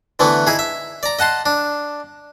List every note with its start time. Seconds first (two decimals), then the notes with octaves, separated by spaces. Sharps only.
0.19 D3 E3 A3 B3
0.47 D#4 E4 G#4
0.59 E5
1.03 D5 A#5
1.19 D#5 F#5 A5 C6
1.46 D4